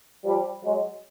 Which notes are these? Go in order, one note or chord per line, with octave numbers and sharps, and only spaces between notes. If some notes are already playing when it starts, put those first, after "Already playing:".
F3 G3
F#3 G#3